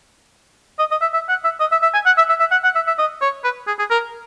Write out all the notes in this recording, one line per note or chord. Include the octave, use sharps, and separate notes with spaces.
D#5
D#5
E5
E5
F#5
E5
D#5
E5
E5
G#5
F#5
E5
E5
E5
F#5
F#5
E5
E5
D#5
C#5
B4
G#4
G#4
A#4